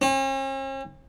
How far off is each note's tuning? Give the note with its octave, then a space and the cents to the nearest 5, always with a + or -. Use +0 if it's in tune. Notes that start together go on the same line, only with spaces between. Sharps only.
C#4 -45